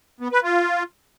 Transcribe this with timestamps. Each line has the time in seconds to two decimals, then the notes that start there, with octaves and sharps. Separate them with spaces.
0.20 B3
0.32 B4
0.44 F4